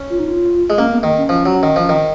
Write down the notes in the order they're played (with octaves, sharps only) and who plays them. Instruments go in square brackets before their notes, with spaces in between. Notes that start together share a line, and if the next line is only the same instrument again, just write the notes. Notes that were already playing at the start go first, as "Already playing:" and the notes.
Already playing: [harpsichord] C#4
[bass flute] F4
D#4
F4
[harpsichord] G#3
[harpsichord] A#3 [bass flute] C#4
[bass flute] B3
[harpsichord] D#3 [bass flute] A#3
[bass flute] C#4
[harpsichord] F3
F#3
D#3
F3
D#3